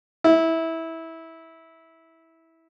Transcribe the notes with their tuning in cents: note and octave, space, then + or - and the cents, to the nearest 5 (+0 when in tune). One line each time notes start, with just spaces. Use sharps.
E4 -15